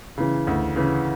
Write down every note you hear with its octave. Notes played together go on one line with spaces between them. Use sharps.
C#3 E3
D2
C#3 E3